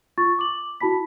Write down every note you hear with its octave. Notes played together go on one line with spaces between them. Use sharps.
F4 C#6 A6
D6 F#7
E4 F#4 A5 B5 B6